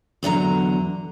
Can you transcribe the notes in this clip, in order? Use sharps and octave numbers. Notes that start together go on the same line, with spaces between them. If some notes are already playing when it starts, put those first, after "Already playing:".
E2 D3 F#3 A#5